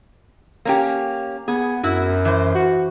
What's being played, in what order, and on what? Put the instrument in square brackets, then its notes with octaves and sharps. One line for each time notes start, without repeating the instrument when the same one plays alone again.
[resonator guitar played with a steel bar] A#3 C#4 G4
[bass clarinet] B3 [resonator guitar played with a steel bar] G#4
[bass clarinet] F#2 [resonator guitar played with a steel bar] E4 F#4
[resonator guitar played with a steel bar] E3 C5
[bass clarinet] F#4